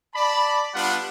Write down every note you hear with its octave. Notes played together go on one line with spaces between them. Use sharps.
D5 A5 B5
G3 B3 D4 F4 F#5